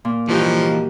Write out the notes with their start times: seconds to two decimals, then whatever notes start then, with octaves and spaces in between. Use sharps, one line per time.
0.05 A#2
0.29 E3 F3 G3 D#4 F#4 G4